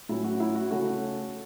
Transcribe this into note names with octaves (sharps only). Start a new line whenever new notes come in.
A2 F#3 C#4 E4
F#4
E4
F#4
C#3 A3 C#4 F#4